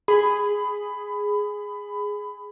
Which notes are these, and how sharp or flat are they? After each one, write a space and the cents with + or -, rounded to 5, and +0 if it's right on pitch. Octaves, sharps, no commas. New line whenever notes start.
G#4 +0 B5 +20